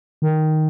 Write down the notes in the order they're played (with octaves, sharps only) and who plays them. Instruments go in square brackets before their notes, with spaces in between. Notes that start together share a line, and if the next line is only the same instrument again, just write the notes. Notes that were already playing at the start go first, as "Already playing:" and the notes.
[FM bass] D#3